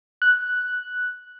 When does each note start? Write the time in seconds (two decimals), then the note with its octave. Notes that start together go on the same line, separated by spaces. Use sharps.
0.22 F#6